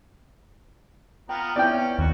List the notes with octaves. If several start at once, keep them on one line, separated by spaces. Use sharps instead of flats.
B3 F4 G5 A#5
B3 C#4 E4 D5 G5
D#2 F#4